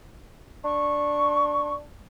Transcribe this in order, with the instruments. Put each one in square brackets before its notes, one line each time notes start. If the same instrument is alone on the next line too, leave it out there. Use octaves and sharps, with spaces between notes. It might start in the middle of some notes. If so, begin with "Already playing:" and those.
[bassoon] D4 [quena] C#6